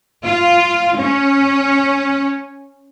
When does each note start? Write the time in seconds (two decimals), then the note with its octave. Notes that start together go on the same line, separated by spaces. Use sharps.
0.24 F4
0.99 C#4